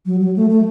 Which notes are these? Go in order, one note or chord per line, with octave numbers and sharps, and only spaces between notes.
F#3
F#3
A3
A3